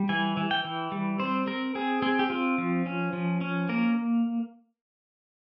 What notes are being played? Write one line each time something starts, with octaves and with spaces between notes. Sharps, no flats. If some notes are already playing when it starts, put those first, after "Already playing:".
Already playing: G3
E3 G#5
E3
G5
E3
G3
C4 C5
C4 A#4
C4 G#4
C4 G#4
G4
C4 F4
F3
C#4
F3
C#4
A#3 A#4